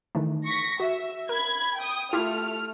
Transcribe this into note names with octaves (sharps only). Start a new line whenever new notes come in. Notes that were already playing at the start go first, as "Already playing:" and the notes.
D#3 E3 A3
C#6 A#6 B6
F#4 E5
A#4 B5 G#6
G5 D#6
A3 E4 F4 G4 F6